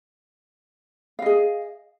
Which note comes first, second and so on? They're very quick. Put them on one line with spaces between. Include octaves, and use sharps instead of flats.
F5 D#5 G#4